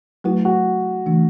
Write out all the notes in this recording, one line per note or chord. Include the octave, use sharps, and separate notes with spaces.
F#3 A3 E4 F#4 B4
F#4
C#3 E3 A3 D4